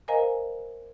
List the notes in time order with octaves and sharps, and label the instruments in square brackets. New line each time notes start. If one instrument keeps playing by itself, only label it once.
[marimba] A#4 C5 D#5 F5 G#5 A#5